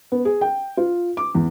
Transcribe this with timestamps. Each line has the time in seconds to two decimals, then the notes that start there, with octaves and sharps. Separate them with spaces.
0.12 B3
0.25 G#4
0.41 G5
0.77 F4
1.17 D6
1.34 E2